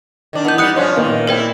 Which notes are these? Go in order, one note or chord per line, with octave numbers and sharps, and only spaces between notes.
D#3 D4
E3 B3 A#4 G6
G3 B3 D#4 D#6 F#6 C#7
G2 F3 C#4 C#5 C6
F#2 A#2 D#3 A#3 B3
G#3 C4 E4 B4 D5 G5